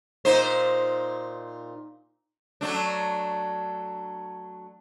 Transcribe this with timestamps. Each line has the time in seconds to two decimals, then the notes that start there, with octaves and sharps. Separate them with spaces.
0.25 A#2 D#4 C5
2.61 F#3 A3 D4